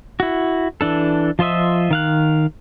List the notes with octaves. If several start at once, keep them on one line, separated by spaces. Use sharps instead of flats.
E4 F#4
E3 D4 A4
F3 F4 C5 D#5 E5
D#3 F5 F#6